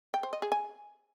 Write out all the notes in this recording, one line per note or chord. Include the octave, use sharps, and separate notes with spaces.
G5
C5
D#5
G#4
G#5